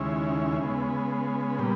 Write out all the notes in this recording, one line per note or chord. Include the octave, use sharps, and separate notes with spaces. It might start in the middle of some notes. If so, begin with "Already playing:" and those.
Already playing: D#2 C#3 G#3 C#4 E4
C#3 G#3 B3
A#2 G3 B3